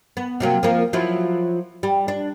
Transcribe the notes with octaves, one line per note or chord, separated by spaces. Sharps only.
B3
C3 F#3 A#3
F3 A#3
F3 F#3 E4
G3
D4